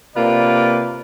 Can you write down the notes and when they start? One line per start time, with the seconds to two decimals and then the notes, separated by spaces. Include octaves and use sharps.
0.17 C3 A#3 F4 B4 D5